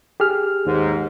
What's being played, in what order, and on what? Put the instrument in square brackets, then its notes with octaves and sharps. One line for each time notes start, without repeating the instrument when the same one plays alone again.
[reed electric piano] G4 G#4 F6
[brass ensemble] D#2 G#2